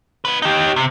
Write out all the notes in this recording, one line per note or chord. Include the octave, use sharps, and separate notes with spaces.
D#4 B4
D#4 G4
C3